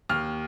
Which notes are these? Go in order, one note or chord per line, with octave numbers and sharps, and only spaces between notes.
D#2 F6